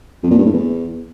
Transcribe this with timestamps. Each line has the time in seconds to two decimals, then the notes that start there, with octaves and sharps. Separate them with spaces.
0.23 F2
0.31 A#2
0.38 G2
0.46 A2
0.53 E2